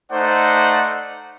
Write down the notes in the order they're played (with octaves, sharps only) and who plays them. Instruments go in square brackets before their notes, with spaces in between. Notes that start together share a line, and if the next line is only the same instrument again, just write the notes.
[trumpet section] A3 D#4 C5 D5 F#5